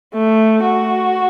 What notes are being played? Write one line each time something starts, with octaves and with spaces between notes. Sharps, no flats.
A3
F#4